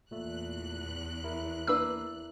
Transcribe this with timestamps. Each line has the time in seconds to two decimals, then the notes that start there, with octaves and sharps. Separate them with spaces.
0.11 E2 A#2 A3 F#6
1.24 E4 A#4 E5
1.67 A#3 D4 B4 E6